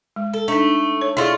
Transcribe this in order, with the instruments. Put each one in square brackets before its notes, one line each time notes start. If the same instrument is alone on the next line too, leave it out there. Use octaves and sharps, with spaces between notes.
[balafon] G#3
[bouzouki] A4
[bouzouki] A3 [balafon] D4 D#4
[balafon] C#5
[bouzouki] A3 F4 [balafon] E4 G#4 D5